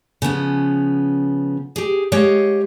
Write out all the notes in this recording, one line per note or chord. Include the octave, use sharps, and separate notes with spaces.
C#3 F3 B3 C#4
G4 G#4
G#3 G4 C#5 D#5 F5